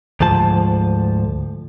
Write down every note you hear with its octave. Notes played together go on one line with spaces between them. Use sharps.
D2 G#2 F3 A5